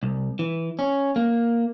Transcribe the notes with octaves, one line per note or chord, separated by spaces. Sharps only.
C2
E3
C#4
A#3